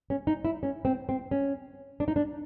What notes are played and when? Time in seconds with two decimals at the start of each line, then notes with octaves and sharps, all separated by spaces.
0.10 C#4
0.27 D#4
0.45 E4
0.63 C#4
0.85 C4
1.09 C4
1.31 C#4
2.00 D4
2.08 D#4
2.16 D4